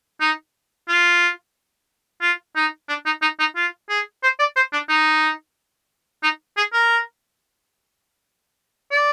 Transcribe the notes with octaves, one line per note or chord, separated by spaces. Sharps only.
D#4
F4
F4
D#4
D4
D#4
D#4
D#4
F4
G#4
C5
D5
C5
D4
D#4
D#4
G#4
A#4
D5